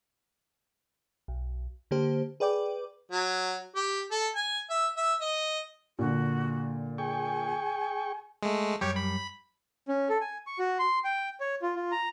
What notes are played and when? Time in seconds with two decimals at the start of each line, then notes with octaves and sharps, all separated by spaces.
1.28 B1
1.91 D3 A#3 G4 C5
2.40 G#4 B4 D5 G5 D6
3.12 F#3
3.76 G4
4.11 A4
4.35 G#5
4.70 E5
4.97 E5
5.21 D#5
5.99 A#2 D3 F#4
6.98 G#4 G5 G#5 C#6
8.43 G#3 A3
8.81 F#2 G3 G4 C#5
8.96 B5
9.88 C#4
10.09 A4
10.21 G#5
10.47 C#6
10.59 F#4
10.79 C6
11.04 G5
11.40 C#5
11.62 F4
11.76 F4
11.91 A#5